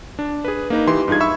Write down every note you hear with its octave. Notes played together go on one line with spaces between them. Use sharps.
D4
G#4 B4
A#3 D#4 B4
E3 G4 C6
G2 D#4 F4 G#4 G#6
E5 B5 C#6 E6